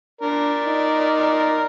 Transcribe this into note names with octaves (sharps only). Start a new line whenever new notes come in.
D4 A#4 D5
D#4